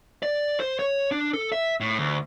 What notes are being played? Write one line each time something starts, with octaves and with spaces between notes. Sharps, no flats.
D5
C5
C#5
D4
A4
E5
A2
D2